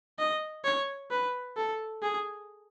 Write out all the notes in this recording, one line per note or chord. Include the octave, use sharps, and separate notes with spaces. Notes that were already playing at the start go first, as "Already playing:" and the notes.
D#5
C#5
B4
A4
G#4